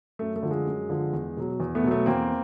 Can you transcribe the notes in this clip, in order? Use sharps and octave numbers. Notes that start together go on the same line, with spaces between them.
F#2 A3
A3
D3 F3
G#3
F#2
D3 F3
E2
B2 F#3
E2
A3 B3
B2 F#3
A3 B3
E2 A#3 C4